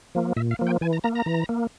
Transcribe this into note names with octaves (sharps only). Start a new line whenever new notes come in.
F3 A#3
A#2 E5
F5
F3 A#3
G5
E3 G#5
A#5
A#3 A#5
A#5
E3
A#3